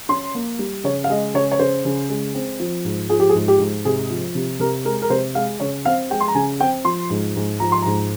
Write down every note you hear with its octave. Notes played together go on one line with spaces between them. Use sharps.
C#4 C6
A#3
G3
C#3 C#5
F5
G#3 D#5
C#3 C#5
C#5
C#3 C5
C#3
G#3
C4
F3
G#2
F3 G#4
G4
G#4
G#2
G4
G#2
C3 G#4
F3
C3
C3 A#4
G#3 A#4
A#4
C3 C5
G#3 F5
C#3 C#5
C4 F5
G#3 G5
C6
A#5
C#3 G#5
C4 G5
F3 C6
G#2
G#2
F3 A#5
C6
G#2 A#5